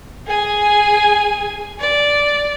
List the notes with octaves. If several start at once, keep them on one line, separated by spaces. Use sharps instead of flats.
G#4 G#5
D5